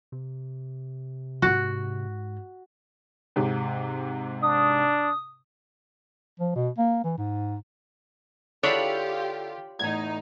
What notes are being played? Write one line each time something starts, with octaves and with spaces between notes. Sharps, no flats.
C3
G#2 F#4
G#2 C3
D4 D#6
F3
B2
A#3
E3
G#2
D3 D4 E4 F4 G4 G#4 C#5 B5
E2 A2 D#4 G#6